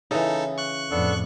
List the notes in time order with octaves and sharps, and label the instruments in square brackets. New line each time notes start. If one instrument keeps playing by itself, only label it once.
[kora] C#3 E3 [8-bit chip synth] D#4 A4
[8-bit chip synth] C#6 F#6
[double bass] F2 A2 [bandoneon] B3 D4 A4